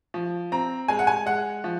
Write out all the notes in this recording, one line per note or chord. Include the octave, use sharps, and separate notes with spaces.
F3
C4 A#5
G#3 G#5
F#5
G#5
G#3 F#5
F3